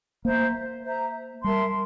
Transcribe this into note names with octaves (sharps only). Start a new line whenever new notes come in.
A#3 C5 E5 A#5
C5 E5 A#5
G3 A#4 E5 A5 C6